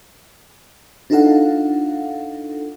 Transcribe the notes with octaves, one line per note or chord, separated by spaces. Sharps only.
D4 D#4 F4 A4 F5 F#5